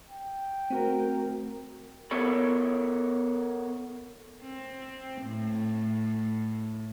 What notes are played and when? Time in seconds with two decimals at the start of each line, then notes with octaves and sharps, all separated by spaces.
0.10 G5
0.70 A3 C4 F#4 A#4
2.11 B3 A4 A#4 C#5 B5
4.42 C4
5.23 A2